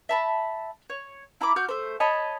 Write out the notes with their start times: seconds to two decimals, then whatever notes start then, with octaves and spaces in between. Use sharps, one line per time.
0.09 E5 A5 B5
0.90 C#5
1.41 E4 A#5 B5 D6
1.56 F#4 F6 G6
1.69 A3 C5
2.00 C#5 D#5 A5 B5